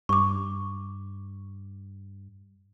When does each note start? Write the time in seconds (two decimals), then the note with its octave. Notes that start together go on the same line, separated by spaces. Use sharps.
0.09 G2 C#6 D6